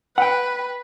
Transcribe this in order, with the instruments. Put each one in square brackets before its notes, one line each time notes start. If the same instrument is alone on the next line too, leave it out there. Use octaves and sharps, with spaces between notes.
[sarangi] B4 [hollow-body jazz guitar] F#5 G5